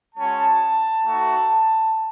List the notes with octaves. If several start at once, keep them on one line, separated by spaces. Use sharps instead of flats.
G#3 C#4 F#4 A5
A3 D#4 F#4